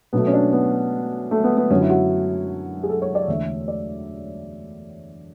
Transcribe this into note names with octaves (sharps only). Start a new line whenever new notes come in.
B2 F#3 A3 B3
C#4
D4
B3
A3
B3
B3
F#2 D3 F#3 C#4
E4
F#4
G#4
A4
C#5
D5
E2 D3 A3 E5
D5